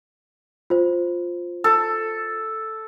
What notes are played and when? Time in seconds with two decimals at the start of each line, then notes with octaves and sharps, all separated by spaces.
0.70 F4 C5
1.64 A4